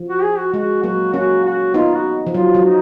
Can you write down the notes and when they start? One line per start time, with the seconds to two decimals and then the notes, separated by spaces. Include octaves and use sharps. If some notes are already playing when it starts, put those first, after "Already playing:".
Already playing: F3
0.08 F#4
0.23 G#4
0.38 F#4
0.53 G#3 F#4
0.83 F#3 A#3 F#4
1.14 A#3 C#4 F#4
1.44 F#4
1.74 B3 D#4 F4
1.94 F#4
2.27 F3
2.34 F#3 F4
2.54 F#3
2.65 D#4